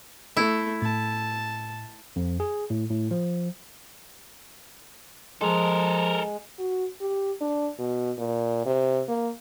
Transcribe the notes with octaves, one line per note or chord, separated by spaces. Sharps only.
A3 E4
A2 A5
F2
G#4
A2
A2
F3
F3 G#3 A4 A#4
F#4
G4
D4
B2
A#2
C3
A#3